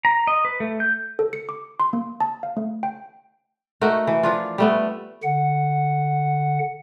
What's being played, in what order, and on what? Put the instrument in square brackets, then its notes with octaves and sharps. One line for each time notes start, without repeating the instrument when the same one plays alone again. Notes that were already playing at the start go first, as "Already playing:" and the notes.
[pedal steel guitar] A#5
D#5
B4
A3
G6
[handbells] A4
C#7
D6
C6
A#3
A5
F5
A3
G5
[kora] A3 D#4 F#4 A#4
E3
F3 D4 F4
G3 A3 B3
[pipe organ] D3 F#5